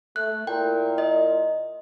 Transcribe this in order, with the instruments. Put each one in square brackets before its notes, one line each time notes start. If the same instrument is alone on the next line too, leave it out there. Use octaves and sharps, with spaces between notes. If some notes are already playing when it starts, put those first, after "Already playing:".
[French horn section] A3 [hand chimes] F#6
[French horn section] A#2 E4 A#4 [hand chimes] G5
[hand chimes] D#5